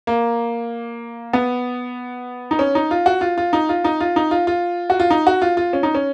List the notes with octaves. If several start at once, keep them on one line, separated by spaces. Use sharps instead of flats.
A#3
B3
D#4
C#4
D#4
F4
F#4
F4
F4
D#4
F4
D#4
F4
D#4
F4
F4
F#4
F4
D#4
F#4
F4
F4
C#4
D#4
C#4